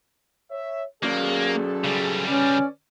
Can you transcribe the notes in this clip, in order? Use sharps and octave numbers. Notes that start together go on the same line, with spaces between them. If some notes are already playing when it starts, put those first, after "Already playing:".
C#5 E5
F#3 A#3 C#4 G#4 A4 D5
C#3 G3
C#4 B4 D5